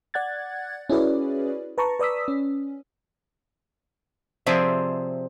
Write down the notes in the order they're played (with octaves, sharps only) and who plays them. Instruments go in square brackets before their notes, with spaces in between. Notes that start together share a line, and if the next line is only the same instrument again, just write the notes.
[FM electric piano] D5 F#5 F#6 G#6 A6
C#4 E4 F#4 G#4 B4 D5
B4 A5 A#5 C#6
B4 D5 D#6 E6 B6
C#4
[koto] C3 F3 C4 G#4 D5 E5